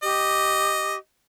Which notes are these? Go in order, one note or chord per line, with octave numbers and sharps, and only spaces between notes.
G4 D#5